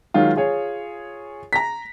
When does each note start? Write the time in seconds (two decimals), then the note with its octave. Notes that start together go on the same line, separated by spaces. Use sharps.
0.14 D#3 F#3 G#3 F4
0.37 F4 G#4 C#5
1.53 A#5 A#6 B6